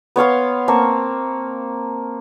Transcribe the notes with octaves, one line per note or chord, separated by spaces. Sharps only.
B3 C#5 F5 C6
A#3 C4 A5 C#6